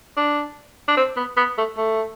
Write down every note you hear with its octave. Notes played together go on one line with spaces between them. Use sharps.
D4
D4
C4
B3
B3
A3
A3